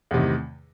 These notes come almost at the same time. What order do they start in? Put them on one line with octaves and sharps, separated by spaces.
E2 C3 D#3 A2